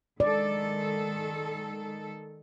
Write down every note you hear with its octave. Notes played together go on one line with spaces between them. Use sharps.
D#3 G#3 A4 D5